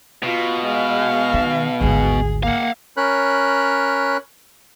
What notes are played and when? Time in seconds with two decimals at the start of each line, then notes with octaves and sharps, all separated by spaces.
0.23 B2 F4
0.66 G#3 F5
1.34 D#3
1.81 G#1 D2 G#4
2.43 A#3 F5 F#5
2.97 C#4 A#4 C#5 B5 F#6